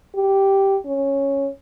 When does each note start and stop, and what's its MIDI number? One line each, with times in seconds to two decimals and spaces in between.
0.15 0.78 67
0.85 1.49 61